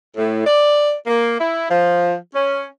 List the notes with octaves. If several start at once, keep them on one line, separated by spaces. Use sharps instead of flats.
A2
D5
A#3
E4
F3
C#4